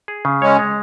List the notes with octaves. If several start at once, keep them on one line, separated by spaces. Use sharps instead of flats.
G#4
C#3
G#3 C#4 C#5
G#3